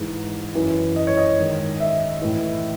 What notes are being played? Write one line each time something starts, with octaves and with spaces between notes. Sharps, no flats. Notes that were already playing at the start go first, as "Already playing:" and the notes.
Already playing: G#2 E3
F#2 E3
D#5
C#5
D#5
G#2 D#3
E5
A2 E3